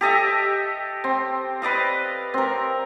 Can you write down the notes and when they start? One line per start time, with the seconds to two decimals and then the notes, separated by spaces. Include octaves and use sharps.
0.01 G4 A4 D#5 E5
1.04 C4
1.62 B4 D5 D#5 F5
2.34 C4 A#4